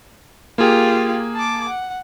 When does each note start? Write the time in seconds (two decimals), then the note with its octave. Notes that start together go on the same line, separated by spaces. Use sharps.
0.58 A#3 F4 G4 G#4
1.35 A5 D6
1.69 F#5